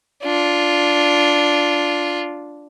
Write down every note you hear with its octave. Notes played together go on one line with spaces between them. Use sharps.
D4 F4